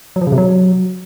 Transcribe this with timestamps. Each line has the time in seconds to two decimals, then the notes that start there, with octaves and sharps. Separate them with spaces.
0.16 F#3
0.21 F3
0.27 C#3
0.32 C3
0.38 F#3